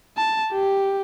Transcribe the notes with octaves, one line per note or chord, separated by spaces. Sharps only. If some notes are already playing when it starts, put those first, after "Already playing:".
A5
G4